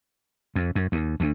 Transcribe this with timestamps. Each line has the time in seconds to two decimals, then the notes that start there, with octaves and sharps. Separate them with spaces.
0.55 F2
0.75 F#2
0.92 D#2
1.20 D2